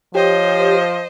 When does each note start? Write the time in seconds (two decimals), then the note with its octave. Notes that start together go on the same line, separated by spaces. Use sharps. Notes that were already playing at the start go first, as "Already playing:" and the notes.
0.15 F3 G4 C5 C#5 D#5